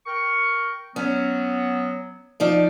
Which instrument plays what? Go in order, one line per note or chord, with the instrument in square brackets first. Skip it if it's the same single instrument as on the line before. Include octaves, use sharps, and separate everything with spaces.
[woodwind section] A#4 G5 C#6
[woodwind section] F#3 B3 [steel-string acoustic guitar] C#4
[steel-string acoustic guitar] F3 D#4 D5